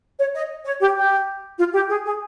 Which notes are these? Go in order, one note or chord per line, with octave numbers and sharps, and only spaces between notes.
C#5
D#5
C#5
G4
G4
F4
G4
G#4
G#4